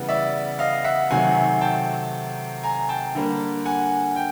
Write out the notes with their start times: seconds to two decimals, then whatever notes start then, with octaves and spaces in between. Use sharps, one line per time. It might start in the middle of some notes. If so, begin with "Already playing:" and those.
Already playing: C#3 E3 G3 B3
0.08 D5 E5
0.59 D#5 F5
0.84 E5 F#5
1.11 C3 D#3 F#3 A3 C4 F#5 G#5
1.61 G5 A5
2.63 G#5 A#5
2.89 G5 A5
3.15 D3 G3 A#3
3.65 F#5 G#5
4.16 G5